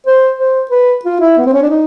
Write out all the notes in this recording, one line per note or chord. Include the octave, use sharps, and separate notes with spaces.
C5
C5
B4
F4
E4
B3
C4
C#4
D4
D#4